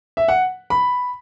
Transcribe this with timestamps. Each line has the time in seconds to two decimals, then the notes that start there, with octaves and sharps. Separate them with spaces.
0.17 E5
0.28 F#5
0.70 B5